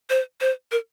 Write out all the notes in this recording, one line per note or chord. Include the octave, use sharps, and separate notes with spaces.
C5
C5
A#4